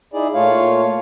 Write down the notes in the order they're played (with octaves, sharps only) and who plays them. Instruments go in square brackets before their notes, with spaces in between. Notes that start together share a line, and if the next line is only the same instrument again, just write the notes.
[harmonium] D#4 E4 G#4 D5
A#2 A3 F4 C#5 F5